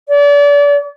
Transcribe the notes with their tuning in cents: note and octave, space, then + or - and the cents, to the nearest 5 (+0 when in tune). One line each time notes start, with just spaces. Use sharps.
D5 -35